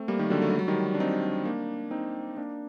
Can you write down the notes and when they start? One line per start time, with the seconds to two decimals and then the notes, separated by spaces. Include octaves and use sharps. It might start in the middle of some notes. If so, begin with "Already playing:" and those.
Already playing: A3 C4
0.08 G3 A#3
0.19 D#3
0.30 D3 F#3
0.42 A3
0.50 G3
0.59 F#3
0.68 D#3 G3
0.94 D4
1.00 C4 D#4
1.45 A#3 D4
1.91 C4 D#4
2.37 A#3 D4